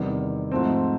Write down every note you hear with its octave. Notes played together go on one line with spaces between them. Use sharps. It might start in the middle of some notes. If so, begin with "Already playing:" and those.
Already playing: E2 C3 D#3 G3
G#2 F3 A3 C4